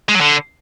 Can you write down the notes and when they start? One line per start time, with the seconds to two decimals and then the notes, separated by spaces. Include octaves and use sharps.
0.09 G#3
0.15 F#3
0.21 D3